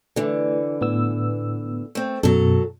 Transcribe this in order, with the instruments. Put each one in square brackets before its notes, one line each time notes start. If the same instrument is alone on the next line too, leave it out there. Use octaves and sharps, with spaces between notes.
[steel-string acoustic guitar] D3 E3 [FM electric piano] A3
[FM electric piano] A2 B3 E6
[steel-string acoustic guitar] A3 C4
[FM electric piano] F#2 B2 [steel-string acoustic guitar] F#3 A4